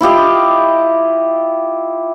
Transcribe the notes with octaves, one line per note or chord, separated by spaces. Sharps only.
E4 F4 G4 D#5